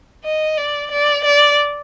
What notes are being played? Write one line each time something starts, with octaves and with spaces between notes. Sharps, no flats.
D#5
D5
D5
D5